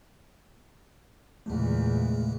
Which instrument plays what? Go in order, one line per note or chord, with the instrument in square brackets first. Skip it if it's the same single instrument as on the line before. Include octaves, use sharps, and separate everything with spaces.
[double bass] E2 A#2 [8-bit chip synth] C#3 G#3 A3